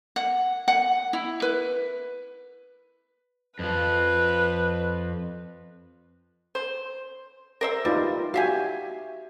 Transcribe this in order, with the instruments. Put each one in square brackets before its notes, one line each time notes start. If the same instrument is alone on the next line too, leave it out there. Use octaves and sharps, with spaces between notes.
[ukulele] F#5
F#5
E4
B4
[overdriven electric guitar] F2 F3 [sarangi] B4
[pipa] C5
A#4 C5 E5
[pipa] G3 [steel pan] D#4 F4 B4
[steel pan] F#4 G#5 [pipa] G4 E5 F5